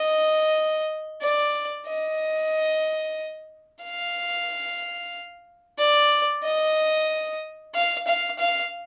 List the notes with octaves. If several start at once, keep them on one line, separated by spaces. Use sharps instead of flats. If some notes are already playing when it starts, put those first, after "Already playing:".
Already playing: D#5
D5
D#5
F5
D5
D#5
F5
F5
F5